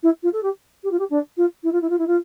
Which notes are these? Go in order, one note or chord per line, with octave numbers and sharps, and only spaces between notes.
E4
F4
A4
G4
G4
F4
G4
D4
F4
E4
F4
E4
F4
E4
F4